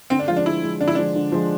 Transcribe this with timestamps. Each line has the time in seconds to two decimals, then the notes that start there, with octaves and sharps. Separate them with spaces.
0.10 D3 C4
0.19 D4
0.28 F3 G#3 F4
0.37 D4
0.45 D3 E4
0.63 F3 G#3
0.80 D3 D4
0.88 E4
0.95 F3 G#3 D4
1.15 D3
1.32 F3 G#3